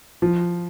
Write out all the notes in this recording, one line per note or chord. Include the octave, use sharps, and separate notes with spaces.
F3